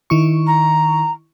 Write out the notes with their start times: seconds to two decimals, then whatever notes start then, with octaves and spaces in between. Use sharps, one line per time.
0.10 D#3 E4 C#6
0.46 A#5